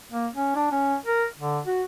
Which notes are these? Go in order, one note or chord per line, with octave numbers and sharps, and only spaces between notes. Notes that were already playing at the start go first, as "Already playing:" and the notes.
A#3
C#4
D4
C#4
A#4
D3
F#4